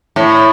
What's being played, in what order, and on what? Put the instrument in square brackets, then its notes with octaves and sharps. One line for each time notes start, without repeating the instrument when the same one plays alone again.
[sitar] A2